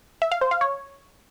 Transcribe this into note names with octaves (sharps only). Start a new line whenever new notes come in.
E5
F5
C5
F5
C#5